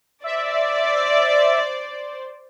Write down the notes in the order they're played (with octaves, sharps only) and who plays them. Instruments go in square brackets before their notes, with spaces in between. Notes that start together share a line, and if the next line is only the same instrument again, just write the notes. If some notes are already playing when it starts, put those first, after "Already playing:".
[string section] C5 D5 [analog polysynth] E5